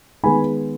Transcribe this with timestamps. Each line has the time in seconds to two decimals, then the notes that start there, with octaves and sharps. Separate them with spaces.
0.24 D#3 G#3 B3 G#5 B5